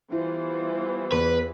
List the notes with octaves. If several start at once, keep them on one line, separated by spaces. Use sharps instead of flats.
E3 G3 B3 E4 F4 C5
E2 B4